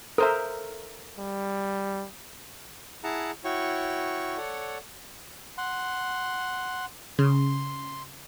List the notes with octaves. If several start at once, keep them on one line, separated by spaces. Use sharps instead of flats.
A4 A#4 C5 E5 A#5
G3
E4 G#4 F#5 A5 A#5
E4 F#4 C#5 G5 C#6
A4 C#5 D5 F#5
F#5 C6
C#3 C6